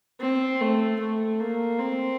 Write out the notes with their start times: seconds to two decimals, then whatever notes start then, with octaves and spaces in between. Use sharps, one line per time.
0.20 C4
0.61 A3
1.00 A3
1.40 A#3
1.80 C4